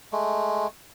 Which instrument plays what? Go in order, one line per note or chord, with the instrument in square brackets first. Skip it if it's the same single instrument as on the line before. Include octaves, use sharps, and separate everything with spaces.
[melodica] G#3 A3